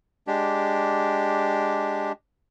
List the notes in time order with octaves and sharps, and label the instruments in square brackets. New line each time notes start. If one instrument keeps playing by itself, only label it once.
[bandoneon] G#3 D4 G4